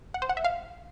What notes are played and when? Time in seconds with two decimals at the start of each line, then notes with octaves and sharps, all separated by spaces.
0.14 F#5
0.22 C5
0.29 F#5
0.37 E5
0.44 F5